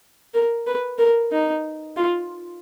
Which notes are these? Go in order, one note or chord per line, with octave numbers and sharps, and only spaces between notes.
A#4
B4
A#4
D#4
F4